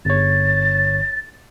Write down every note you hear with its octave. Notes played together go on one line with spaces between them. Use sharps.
G1 C#5 A6